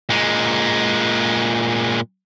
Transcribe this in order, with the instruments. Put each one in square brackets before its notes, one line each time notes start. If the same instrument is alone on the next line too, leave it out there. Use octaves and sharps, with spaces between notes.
[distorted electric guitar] A#2 G#3